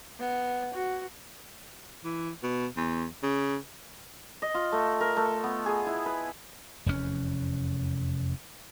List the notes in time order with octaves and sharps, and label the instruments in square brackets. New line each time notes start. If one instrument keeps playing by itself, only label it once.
[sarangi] B3
F#4
[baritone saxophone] E3
B2
E2
C#3
[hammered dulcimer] D#5
F4
A3
A#4
A3
B3
G#4
E4
B4
[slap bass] F1 E2 G2 C#4